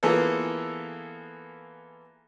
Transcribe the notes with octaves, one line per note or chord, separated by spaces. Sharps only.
E3 A#3 B3 F4 G#4 A4